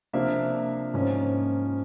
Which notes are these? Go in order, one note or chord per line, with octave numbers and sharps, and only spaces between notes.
C3 F3 A#3 D4 E5
G#2 F3 A#3 C#4